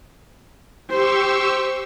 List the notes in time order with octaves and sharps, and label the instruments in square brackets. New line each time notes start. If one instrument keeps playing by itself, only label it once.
[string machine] G4 C#6 E6 [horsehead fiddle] C5